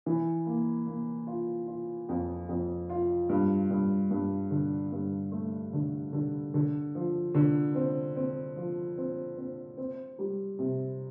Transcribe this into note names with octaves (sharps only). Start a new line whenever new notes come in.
E3
A#3
A#3
F4
F4
F2
F2
F4
G2
G2
G2
D3
G2
A3
D3
D3
D3
F3
D3
C4
C4
F3
C4
C4
C4
G3
C3